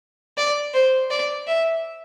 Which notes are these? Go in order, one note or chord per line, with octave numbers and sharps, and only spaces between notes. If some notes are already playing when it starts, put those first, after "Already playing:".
D5
C5
D5
E5